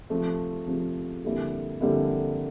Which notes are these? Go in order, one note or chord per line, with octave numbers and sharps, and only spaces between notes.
C3 F3 A3
C3 F3 A3
F2 D3 G3 A#3 E4
F2 D3 G3 A#3 E4